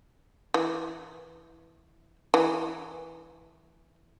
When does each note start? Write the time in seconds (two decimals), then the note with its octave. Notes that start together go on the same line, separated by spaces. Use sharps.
0.54 E3
2.34 E3